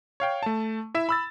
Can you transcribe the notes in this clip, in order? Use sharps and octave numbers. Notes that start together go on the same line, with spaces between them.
C#5 F5 G5
A3 A5
E4 E5 E7
B5 E6 A6